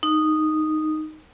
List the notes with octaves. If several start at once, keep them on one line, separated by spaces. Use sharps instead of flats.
D#4